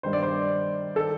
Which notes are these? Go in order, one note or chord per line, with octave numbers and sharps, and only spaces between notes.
G2 D#3 C5
D5
C5
D#3 A4